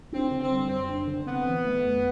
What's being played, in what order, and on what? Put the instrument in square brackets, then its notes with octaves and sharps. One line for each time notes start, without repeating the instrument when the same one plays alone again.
[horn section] C4 [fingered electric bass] D4
[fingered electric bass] D3
[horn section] C4
[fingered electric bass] G3
[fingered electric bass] F#2 [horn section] C4
[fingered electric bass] D4
D3
[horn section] B3 [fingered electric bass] C4
[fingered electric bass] E3
A3
F#2